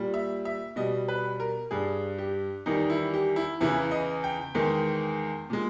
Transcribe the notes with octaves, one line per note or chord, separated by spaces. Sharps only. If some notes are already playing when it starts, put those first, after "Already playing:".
Already playing: A#2 G3
E5
E5
B2 G3 D#5
B4
A#4
G2 G3 G#4
G4
E2 D#3 G3 D#4
E4
G4
E4
E2 C#3 E3 E4
D#5
G5
E2 D#3 G#3
A#2 G#3